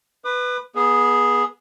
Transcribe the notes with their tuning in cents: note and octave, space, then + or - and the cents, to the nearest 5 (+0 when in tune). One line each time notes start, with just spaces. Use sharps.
B4 +5 D#6 -45
B3 -25 G#4 +0